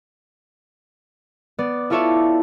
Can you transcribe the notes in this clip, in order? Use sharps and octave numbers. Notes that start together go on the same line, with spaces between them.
B3 D5
E4 F4 A4 C#5 D5 E5